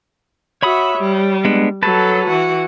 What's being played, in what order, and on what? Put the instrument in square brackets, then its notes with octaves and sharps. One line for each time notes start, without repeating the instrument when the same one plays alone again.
[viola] F#4 E5 [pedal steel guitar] C#5 B5 D#6
[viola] G3
[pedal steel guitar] G#3 B3 D4
[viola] F#3 A4 [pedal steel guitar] B4 A5
[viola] E3 F#4